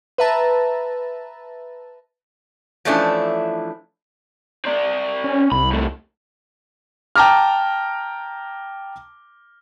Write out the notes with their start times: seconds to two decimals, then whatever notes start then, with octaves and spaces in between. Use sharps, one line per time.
0.18 B4 E5 A5 A#5
2.85 E3 F3 A3 C#4 D4 E4
4.65 C4 D5
5.24 C#4
5.52 C2 B5
5.71 G2 A3
7.16 G5 A5 A#5 D6 F6